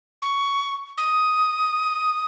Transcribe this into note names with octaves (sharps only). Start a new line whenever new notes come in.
C#6
D#6